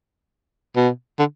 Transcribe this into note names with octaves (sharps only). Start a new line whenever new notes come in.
B2
D3